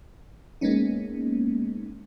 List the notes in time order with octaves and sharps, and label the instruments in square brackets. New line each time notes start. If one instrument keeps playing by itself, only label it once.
[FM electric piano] G#3 A#3 B3 C#4 D#4